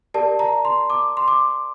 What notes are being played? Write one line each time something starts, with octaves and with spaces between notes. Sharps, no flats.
G4 A#4 D5 A5
A#5
C6
D6
C6
D6